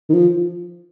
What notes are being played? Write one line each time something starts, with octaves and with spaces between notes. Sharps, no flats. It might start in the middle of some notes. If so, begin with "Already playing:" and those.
D#3
F3